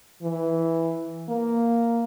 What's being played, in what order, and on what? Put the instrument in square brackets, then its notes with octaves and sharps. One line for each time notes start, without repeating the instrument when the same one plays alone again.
[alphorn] E3
A#3